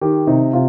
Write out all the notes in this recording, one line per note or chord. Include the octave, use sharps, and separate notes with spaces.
D#3 G4
C3 D#4
C3 F4